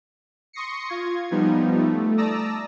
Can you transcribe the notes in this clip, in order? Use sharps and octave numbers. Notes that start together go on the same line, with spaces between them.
C6 C#6 D#6 A#6 C7 C#7
F4 G#6
F3 G3 B3 D#4
A3
D5 A5 A#5 D#6 E6 A#6